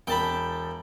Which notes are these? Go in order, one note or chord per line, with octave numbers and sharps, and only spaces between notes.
E1 G5 A5 B5